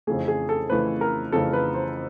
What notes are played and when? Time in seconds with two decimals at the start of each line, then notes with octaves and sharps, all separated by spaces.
0.07 F2 C#3 E3 A3 G#4
0.28 G#4
0.49 A4
0.70 F2 C#3 E3 A3 B4
1.01 A#4
1.32 F2 C#3 E3 A3 A4
1.53 B4
1.74 C5